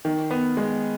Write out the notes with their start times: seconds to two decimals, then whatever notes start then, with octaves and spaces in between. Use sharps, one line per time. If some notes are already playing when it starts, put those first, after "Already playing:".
0.05 D#3
0.31 B3
0.57 G#3